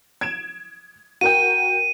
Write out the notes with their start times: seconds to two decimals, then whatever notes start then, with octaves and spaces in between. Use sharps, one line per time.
0.21 G#6 D7 E7
1.21 F#4 A#4 G5 D#7